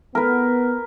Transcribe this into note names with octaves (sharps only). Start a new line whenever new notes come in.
B3 A#4 B4